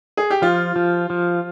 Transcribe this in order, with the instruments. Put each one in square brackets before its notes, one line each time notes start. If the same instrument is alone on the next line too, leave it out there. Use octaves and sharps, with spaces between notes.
[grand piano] G#4
G4
[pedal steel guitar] F3 [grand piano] F4
[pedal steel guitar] F3
F3